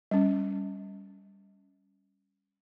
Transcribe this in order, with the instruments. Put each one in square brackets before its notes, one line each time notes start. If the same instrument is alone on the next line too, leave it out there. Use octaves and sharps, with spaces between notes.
[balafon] G3 C#4